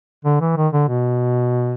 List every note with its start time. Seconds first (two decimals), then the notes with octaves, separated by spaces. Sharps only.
0.25 D3
0.41 E3
0.57 D#3
0.73 D3
0.88 B2